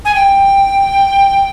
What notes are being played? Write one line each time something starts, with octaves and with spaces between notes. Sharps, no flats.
G#5
G5